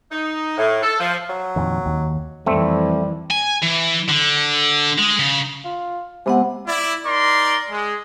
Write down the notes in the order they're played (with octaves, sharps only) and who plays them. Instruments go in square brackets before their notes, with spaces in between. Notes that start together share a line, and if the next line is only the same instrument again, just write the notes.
[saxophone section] D#4
A2
A4
F3
[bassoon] F#3
[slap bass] F2 A#2 D#3
D#2
[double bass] F2 E3 [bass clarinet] G3 [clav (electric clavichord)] A3 C4
[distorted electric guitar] G#5
E3
D3
G#3
C#3
[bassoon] F4
[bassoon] C3 [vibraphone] G#3 B3 F#5
[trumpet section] E4 D5
D#4 A#4 D5 C6
G#3